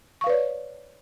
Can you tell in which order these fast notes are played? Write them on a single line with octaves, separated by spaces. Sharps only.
C#6 F5 B4 D5 C#5